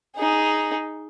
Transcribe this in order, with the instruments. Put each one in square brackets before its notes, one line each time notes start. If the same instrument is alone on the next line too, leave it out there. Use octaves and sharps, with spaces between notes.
[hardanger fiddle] D#4 G#4